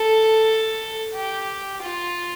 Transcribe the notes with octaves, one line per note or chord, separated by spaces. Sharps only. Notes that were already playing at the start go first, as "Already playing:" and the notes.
Already playing: A4
G4
F4